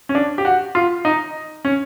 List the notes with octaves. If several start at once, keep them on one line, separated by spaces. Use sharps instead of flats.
C#4
D4
G4
F#4
F4
D#4
C#4